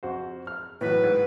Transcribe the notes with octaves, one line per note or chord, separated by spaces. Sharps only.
F2 F#4 C5
F6
A2 E3 F#3 B4
G#2